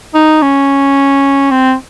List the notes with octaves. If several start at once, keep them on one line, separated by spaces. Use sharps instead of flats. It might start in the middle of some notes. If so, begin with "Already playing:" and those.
D#4
C#4
C4